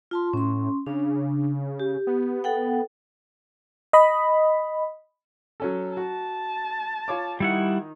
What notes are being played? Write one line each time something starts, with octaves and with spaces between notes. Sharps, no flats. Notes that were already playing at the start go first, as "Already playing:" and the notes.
F4 A5 C6
A2 C#4 C6
C#3 D4
G4
B3
A4 F#5 G5
D#5 B5
F#3 C#4 A4
F#4 A5
F4 C#5 D6
D#3 G3 E4 F#5